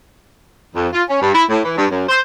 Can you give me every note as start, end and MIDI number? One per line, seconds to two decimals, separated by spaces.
0.76 0.88 41
0.93 1.03 65
1.09 1.22 61
1.22 1.32 43
1.34 1.43 64
1.49 1.62 45
1.65 1.76 52
1.77 1.86 43
1.90 2.04 42
2.09 2.19 72